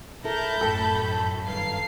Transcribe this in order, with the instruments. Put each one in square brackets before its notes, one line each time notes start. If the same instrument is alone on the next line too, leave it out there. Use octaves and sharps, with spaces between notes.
[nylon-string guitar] E4 A4 [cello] A#4 [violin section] A5 B5 G6
[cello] F#2 [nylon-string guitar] A2 G5 [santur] A4
[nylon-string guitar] G2 D#3 [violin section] F5 C7